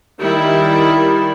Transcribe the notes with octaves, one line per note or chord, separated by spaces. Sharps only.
D#3 G3 E4